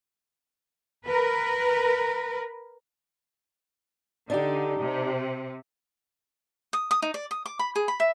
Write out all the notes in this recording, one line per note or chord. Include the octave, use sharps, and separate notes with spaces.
A#4 B4
D3 D4 D#4 G4
C3
D#6
D#6
D#4
D5
D#6
D6
B5
G#4
B5
E5